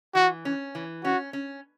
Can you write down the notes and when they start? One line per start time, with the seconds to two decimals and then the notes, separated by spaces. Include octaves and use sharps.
0.15 E3 F#4
0.45 C#4
0.75 E3
1.04 C#4 F#4
1.33 C#4